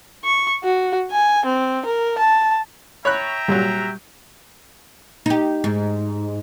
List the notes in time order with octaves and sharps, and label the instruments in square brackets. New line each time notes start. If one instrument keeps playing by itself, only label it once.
[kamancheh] C#6
F#4
G#5
C4
A#4
A5
[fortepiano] C#5 B5 F#6 [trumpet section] E5 G5 A#5
[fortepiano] A#2 F#3 [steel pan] G3
[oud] D#4 G4
G#2